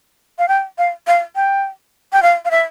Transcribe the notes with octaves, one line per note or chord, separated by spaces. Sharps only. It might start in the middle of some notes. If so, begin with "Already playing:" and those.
F5
G5
F5
F5
G5
G5
F5
F5
E5